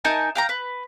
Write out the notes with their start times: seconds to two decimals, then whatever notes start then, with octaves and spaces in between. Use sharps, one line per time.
0.05 D#4 A#4 G#5 A5
0.35 F5 G5 A#5
0.49 B4